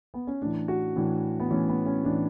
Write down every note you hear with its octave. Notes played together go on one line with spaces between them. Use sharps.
B3
C#4
A2 E3 D4
F#4
A2 E3 D4
B3
A2 E3 C#4
B3
C#4
A2 E3 D4